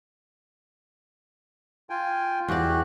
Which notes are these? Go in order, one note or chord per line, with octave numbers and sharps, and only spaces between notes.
F4 G5 G#5
E2 F#4 G4 D5 F#6